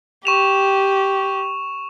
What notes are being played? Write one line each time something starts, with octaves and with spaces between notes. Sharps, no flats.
G4 C#6 E7 F7